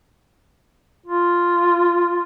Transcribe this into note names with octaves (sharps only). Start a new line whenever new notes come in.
F4